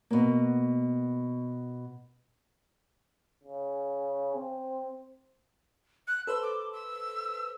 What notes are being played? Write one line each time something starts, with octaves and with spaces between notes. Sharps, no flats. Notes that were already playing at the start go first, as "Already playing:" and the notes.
B2 A#3
C#3
C4
F#6
A4 B4 C5 E6
D6
E6